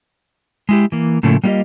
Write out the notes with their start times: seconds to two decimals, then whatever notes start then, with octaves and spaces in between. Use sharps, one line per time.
0.69 G#3 E4 G4
0.92 E3 A#3
1.23 A2 C#3 F3 A3 A#3
1.44 G3 A#3 D4 F4 G4 D#5